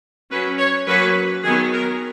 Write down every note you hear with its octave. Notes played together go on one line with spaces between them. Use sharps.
F#3 C#4 B4
C#5
F#3 A#3 C#4 B4
D#3 F#3 B3 G#4
A#4